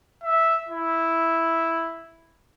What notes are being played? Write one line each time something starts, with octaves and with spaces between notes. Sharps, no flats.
E5
E4